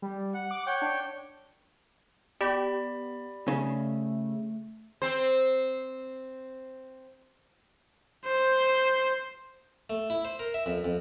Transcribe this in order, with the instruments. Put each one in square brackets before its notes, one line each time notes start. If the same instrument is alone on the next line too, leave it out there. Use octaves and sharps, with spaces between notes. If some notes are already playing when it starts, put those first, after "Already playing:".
[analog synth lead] G3
[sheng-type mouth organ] F#5
[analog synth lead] D6
[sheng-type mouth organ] C#5 G5 [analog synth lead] F#5
[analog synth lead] D4
[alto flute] B3 [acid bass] G4 [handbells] D5 B5
[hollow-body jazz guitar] C#3 [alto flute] A3
[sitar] C4 C5
[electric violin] C5
[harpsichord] A3
E4
C5
A#4
E5
F2
F2